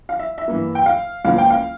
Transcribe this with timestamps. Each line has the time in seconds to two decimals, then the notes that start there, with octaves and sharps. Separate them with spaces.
0.09 F5
0.19 E5
0.38 E5
0.48 G2 E3 A#3
0.75 G5
0.86 F5
1.25 C#2 C#3 F3 A#3 F5
1.38 G5
1.50 F5